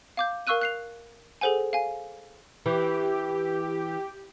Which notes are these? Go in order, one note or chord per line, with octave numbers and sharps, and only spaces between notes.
F5 D6 G6
A#4 F5 C#6 E6 F#6 D#7
F#6 C7 F7
G#4 A4 C5 F#5 G#5
F5 G#5
E3 G4